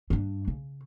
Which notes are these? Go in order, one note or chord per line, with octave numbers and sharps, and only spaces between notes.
G2 D4
C#3